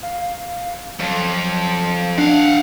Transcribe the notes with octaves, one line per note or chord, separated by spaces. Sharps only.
F5
F2 F#3
D4 F5 F#5